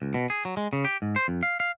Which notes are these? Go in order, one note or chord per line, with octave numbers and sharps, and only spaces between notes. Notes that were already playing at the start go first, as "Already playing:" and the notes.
C#2
B2
G#4
F#3
G#3
C#3
G4
G#2
C5
F2
F5
F5